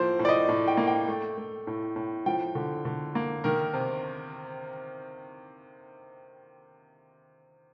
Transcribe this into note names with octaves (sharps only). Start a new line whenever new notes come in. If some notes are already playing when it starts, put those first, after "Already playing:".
Already playing: A2 F3 A#3 C5
A2
D5
D#5
A2
G5
A#3
G5
A3
A3
A2
A2
F3 G5
D3
D3
A#3
D#3 A#4
C3